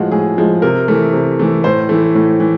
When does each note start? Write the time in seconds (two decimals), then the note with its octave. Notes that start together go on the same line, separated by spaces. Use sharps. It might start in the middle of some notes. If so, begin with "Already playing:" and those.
Already playing: A2 F3 G#3 F#4
0.12 A2 G#4
0.38 F3 G#3
0.62 C3 A#4
0.88 E3 A3
1.13 C3
1.39 E3 A3
1.64 A2 C5
1.89 E3 A3
2.15 A2
2.40 E3